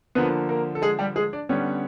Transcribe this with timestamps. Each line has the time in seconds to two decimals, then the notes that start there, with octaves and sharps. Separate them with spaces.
0.15 D3 F3 A#3 B3 B4
0.49 A#3 A#4
0.75 A4
0.82 G#3 G#4
0.99 G3 G4
1.16 G#3 G#4
1.33 D4 D5
1.49 D3 G3 B3 C#4 C#5